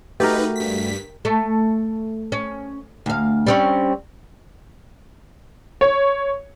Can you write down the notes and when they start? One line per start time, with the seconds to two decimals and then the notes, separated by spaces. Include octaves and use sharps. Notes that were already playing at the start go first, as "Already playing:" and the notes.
0.20 A3 D#4 F#4 G4 A#4 B4
0.56 G2 B6
1.25 A3
2.32 C#4
3.06 D2 F5
3.47 G3 C4 C#4
5.81 C#5